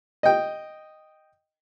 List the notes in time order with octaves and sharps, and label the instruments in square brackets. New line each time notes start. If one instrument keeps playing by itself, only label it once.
[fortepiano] D#5 G5